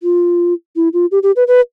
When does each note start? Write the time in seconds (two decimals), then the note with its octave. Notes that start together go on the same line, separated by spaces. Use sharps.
0.03 F4
0.76 E4
0.93 F4
1.11 G4
1.23 G4
1.36 B4
1.48 B4